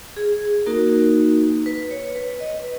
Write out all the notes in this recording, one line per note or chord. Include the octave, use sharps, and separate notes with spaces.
G#4
A#3 D#4 F#4 A#4
B4
C#5
B4
D#5
B4